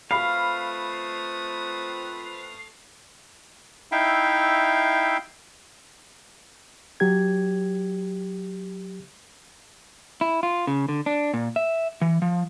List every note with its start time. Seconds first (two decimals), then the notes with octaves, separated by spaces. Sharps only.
0.11 A3 C4 F4 B4 F5 B5 D#6 C7
3.92 D#4 E4 E5 F5 G5
7.00 F#3 G4 G#6
10.21 E4
10.43 F4
10.67 C#3
10.89 D3
11.06 D4
11.34 A#2
11.56 E5
12.01 E3
12.22 F3